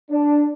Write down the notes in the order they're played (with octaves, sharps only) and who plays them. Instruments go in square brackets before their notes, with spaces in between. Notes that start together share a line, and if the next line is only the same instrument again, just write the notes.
[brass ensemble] D4